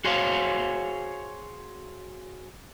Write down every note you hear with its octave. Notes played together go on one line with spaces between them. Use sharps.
F#4 G#4 C5 C#5 F5